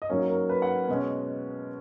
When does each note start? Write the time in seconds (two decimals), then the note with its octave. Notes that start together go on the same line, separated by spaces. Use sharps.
0.02 D#5
0.09 G#2 F#3 A#3 C#4 C#5
0.29 A#4
0.49 B4
0.62 F#5
0.88 B2 G#3 C#4